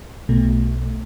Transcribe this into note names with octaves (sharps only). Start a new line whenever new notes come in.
B1 B2 A3